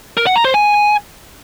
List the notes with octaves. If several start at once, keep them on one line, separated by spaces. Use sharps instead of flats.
A#4
F#5
A#5
C5
G#5